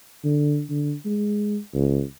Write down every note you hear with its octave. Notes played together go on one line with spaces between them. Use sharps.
D3
D3
G#3
C#2